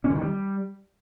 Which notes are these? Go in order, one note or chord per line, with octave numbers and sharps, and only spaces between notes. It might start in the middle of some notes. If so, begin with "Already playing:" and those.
C#4
E3
D#3
G3